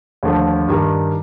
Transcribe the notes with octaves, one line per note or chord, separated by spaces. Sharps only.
D#2 D3 F3 A3
G2 D#3 G3